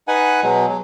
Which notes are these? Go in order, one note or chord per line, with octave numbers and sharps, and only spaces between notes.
D#4 B4 F#5 G#5
B2 F#3 G#3
F#3